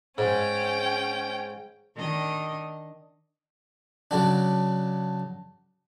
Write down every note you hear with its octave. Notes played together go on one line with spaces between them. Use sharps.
G#2 C#4 G5
D#3 D4 D#5
C#3 F#3 D4